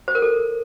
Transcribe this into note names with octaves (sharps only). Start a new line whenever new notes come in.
C5
A#4
A4